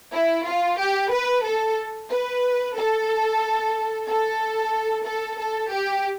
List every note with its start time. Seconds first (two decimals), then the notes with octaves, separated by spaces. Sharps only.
0.14 E4
0.47 F4
0.80 G4
1.13 B4
1.46 A4
2.11 B4
2.77 A4
4.08 A4
5.06 A4
5.40 A4
5.73 G4